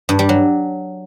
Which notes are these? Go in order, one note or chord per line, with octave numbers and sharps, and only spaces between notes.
G2
G3
F#3